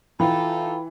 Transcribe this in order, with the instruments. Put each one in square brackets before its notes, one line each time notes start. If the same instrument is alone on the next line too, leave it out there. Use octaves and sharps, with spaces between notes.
[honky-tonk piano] E3 [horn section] D#4 F4 A4 [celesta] G5 B5